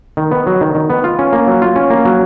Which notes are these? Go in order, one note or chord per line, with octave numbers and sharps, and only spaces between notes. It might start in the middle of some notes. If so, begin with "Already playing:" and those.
D#3
B3
F#3
D#3
D#3
B3
F4
C#4
A#3
F#3
F4
C#4
A#3
F#3